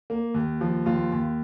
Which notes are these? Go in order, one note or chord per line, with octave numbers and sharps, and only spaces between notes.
A#3
D#2
F3
D#2 F4
D#2